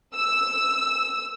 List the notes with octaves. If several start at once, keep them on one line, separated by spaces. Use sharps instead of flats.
E6